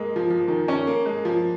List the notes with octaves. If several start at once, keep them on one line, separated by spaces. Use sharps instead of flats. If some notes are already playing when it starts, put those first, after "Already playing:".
Already playing: G#3 A#3
F3
F3
D#3
C#4
A#3
G#3
F3